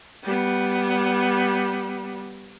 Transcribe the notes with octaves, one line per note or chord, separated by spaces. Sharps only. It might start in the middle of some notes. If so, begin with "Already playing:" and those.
G3 B3